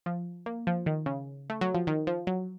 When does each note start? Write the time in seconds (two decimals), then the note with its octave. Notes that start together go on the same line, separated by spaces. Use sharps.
0.06 F3
0.46 A#3
0.67 F3
0.86 D#3
1.06 C#3
1.50 A3
1.61 F#3
1.75 F3
1.87 D#3
2.07 F3
2.27 F#3